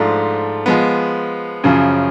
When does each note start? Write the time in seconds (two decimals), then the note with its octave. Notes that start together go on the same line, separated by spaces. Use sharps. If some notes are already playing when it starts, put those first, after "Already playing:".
Already playing: G#2 F3 A3 D4 F4
0.66 F3 G#3 B3
1.64 F#2 C#3 F3